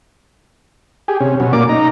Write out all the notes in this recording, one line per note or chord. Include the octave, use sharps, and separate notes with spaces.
G4 G#4
C3 C#4
B2 F#3 C#4
A#2 A#3 D5 D6
D#4 A#5